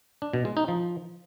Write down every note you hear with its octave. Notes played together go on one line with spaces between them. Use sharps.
D4
B2
G#3
D#4
F3